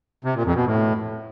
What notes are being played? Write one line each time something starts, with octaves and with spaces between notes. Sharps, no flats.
C3
A#2
F2
B2
A2